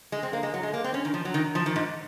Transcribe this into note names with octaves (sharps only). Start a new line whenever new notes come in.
G#3
C4
A#3
G#3
F#3
G#3
A#3
C4
C#4
D#3
F3
F#3
D#3
F3
D#3
G#2